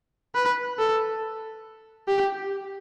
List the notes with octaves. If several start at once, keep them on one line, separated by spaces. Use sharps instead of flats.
B4
A4
G4